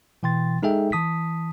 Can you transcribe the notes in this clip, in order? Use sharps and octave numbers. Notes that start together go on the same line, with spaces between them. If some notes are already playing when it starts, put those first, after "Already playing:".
B2 E3 G5 C6 A6
G#3 D#4 G#4 A4 E5 G5
E3 A5 D#6 B6